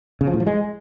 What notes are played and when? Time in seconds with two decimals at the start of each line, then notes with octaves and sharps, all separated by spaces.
0.21 C#3
0.27 F3
0.34 A2
0.40 F3
0.47 G#3